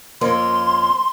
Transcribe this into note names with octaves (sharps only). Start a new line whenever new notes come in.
F2 A#3 C#4 C6